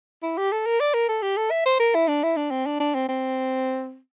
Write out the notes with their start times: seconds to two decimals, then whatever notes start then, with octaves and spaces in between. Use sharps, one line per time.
0.23 E4
0.38 G4
0.52 A4
0.66 A#4
0.80 D5
0.94 A#4
1.09 A4
1.22 G4
1.37 A4
1.51 E5
1.66 C5
1.80 A#4
1.95 E4
2.08 D4
2.23 E4
2.37 D4
2.51 C4
2.66 D4
2.80 D4
2.95 C4
3.09 C4